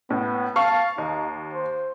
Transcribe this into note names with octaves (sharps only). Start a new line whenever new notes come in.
A2 B3
F5 A5 C#6
D#2 D#4
C5